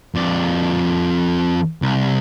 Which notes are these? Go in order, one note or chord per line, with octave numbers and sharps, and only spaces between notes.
F2 D5
C2